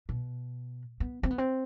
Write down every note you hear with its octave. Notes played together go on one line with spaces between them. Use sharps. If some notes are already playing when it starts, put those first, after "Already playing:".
B2
B3
C4
B3
C4